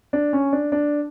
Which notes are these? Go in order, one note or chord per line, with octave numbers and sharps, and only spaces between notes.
D4
C#4
D4
D4